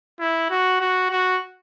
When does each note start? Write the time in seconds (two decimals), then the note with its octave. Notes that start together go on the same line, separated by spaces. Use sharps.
0.20 E4
0.51 F#4
0.80 F#4
1.11 F#4